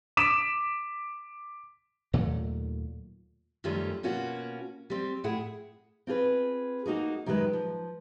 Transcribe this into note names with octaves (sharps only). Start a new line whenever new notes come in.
D6 B6 E7
D#2 A#2 F#3 A3
F#2 D#3 F3 G3 A3 C#4
B2 A#3 C#4 F4 F#4
G3 C4
A2 E4 G#4 F#5 G5
C4 F4 G#4 B4
A#3 D#4 F#4 G#4
F#2 D#3 G3 G#3 B4
F3